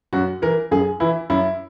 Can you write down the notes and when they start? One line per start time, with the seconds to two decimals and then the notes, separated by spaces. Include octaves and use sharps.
0.13 F#2 F#4
0.42 E3 A#4
0.71 F#2 G#4
1.00 E3 E4
1.30 F#2 E4